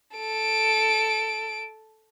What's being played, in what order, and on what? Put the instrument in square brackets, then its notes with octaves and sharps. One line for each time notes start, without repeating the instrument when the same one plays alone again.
[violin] A4 D7